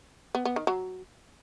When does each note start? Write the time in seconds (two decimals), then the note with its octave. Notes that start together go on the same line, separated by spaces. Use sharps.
0.35 B3
0.45 B3
0.56 D#3
0.67 F#3